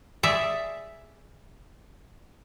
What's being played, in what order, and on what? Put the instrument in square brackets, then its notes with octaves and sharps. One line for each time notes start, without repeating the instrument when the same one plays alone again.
[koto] G#4 D5 E5